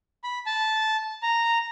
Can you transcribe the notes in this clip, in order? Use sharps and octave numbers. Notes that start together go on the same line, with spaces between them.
B5
A5
A#5